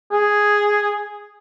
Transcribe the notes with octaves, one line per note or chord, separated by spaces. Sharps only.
G#4